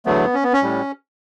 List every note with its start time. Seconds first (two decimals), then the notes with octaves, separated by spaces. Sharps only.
0.06 E2 D3 F#3 A3 B3
0.34 C#4
0.43 B3
0.53 C#4
0.62 A2 G3